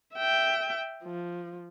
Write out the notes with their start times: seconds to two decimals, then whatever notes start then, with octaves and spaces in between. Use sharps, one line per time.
0.14 E5 G5
1.04 F3